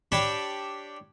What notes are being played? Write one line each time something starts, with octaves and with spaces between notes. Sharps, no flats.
D4 G4 C#5 A5 B5